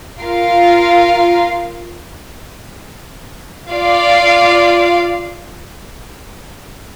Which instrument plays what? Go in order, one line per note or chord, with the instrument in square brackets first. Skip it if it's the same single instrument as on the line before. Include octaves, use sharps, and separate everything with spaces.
[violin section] F4 A#4 F5
F4 D5 F5